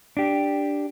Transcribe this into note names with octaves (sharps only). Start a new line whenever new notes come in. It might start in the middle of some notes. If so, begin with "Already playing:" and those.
D4 G4